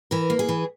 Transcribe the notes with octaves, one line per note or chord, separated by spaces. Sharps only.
E3 A#4
A#3
G#4
E3